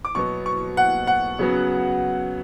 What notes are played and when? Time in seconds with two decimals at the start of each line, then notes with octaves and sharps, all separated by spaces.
0.05 D6
0.15 B2 F#3 B3 C#6
0.46 C#6
0.77 F#5
1.07 F#5
1.39 C#3 F#3 B3